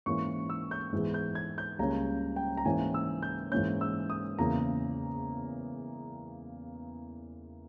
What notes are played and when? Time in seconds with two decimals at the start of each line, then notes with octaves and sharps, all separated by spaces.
0.06 G#2 E3 A#3 C#4 C#6
0.49 E6
0.71 G6
0.93 G#2 E3 G#3 B3
1.14 G6
1.35 G#6
1.58 G6
1.79 C#2 C#3 G3 A#3 C#4 A#5
2.36 G5
2.57 A#5
2.65 G#2 E3 A#3 C#4 G#5
2.94 E6
3.23 G6
3.52 G#2 E3 A#3 C#4 G6
3.81 E6
4.10 D#6
4.38 E2 C#3 E3 A#3 C#4 A#5